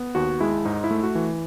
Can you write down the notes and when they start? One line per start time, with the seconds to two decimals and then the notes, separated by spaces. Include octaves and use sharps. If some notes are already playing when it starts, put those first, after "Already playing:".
Already playing: B3
0.15 D#2 F#4
0.40 G#3 E4
0.65 G#2 D#4
0.84 E4
0.91 A3
1.03 F#4
1.15 E3